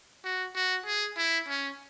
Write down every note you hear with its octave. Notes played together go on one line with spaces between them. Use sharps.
F#4
F#4
G#4
E4
C#4